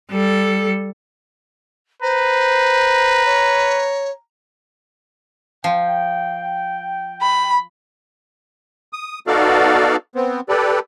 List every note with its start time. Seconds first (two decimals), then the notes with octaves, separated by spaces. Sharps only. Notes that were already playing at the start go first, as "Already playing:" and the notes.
0.11 G3 A4
2.02 B4 C5 A#5
3.25 C#5
5.64 F3 G5
7.21 B5
8.93 D#6
9.27 B3 D#4 F#4 A4 D5 F5
10.15 B3 C4
10.49 G4 A4 B4 D5